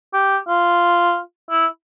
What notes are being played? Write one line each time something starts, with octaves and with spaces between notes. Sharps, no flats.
G4
F4
E4